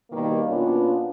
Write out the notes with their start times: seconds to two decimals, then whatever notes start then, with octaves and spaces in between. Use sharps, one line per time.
0.11 B2 D#3 G3 A#3
0.47 B2 A#3 B3 C#4 D4 F4